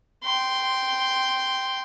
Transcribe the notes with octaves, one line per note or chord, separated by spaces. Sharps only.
G5 C6